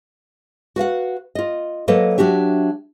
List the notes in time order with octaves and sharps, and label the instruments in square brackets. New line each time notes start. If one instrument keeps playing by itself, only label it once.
[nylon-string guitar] F#4 B4 F5 F#5
F4 D#5
F#3 A#3 A4 B4 C5 D#5
F#3 D4 F#4 G4 E5